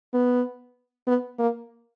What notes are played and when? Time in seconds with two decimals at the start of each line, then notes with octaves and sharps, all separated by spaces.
0.14 B3
1.07 B3
1.39 A#3